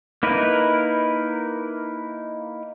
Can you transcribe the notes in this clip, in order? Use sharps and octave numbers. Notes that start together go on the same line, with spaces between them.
A#3 D#4 E4 A#4 B4